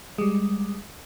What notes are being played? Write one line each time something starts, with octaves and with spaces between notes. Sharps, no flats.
G3 G#3